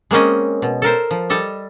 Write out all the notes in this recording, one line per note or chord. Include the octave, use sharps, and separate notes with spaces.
G#3 A#3 C4 C#4 D#5
B2
A4 A#4 C5
F3
G3 A4 D#5 E5